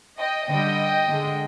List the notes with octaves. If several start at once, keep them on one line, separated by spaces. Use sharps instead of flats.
D#5 G5
D3 G3 D#5 G5
D3 G#3